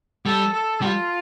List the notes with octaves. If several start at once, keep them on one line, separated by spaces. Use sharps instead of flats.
G3 A4
A4
G3 F4